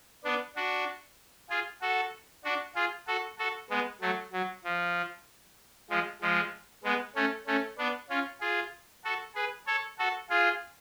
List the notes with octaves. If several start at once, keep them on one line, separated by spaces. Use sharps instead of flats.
B3 D4
D4 F#4
F4 G#4
F#4 A4
D4 F#4
F4 G#4
F#4 A4
F#4 A4
G#3 B3
F#3 A3
F#3
F3
F3 G#3
F3 G#3
G#3 B3
A3 C#4
A3 C#4
B3 D4
C#4 F4
F4 G#4
F#4 A4
G#4 B4
A4 C#5
F#4 A4
F4 G#4